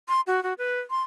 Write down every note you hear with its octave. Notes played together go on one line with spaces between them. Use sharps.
C6
F#4
F#4
B4
C6